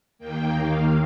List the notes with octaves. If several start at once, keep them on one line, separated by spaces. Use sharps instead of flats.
D#2 D#3 A#3 G5
F5